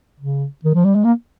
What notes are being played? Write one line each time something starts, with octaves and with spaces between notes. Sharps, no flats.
C#3
D#3
F3
G3
G#3
A#3